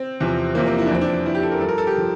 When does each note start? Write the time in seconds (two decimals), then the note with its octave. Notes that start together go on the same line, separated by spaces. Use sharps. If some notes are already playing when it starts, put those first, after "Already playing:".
Already playing: C4
0.20 E2 C3 F3
0.55 E2 C3 F3 A#3
0.67 C4
0.78 E4
0.86 D4
0.91 F2 E3 C4
1.01 D4
1.25 F2 E3 E4
1.35 G4
1.43 A4
1.52 A#4
1.60 G2 F3 A4
1.68 A#4
1.78 A4
1.87 G4
1.97 F3